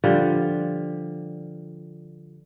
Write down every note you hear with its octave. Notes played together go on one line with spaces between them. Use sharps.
D3 F3 G3